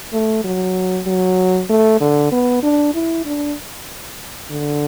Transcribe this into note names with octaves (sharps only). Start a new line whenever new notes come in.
A3
F#3
F#3
A3
D3
B3
D4
E4
D4
D3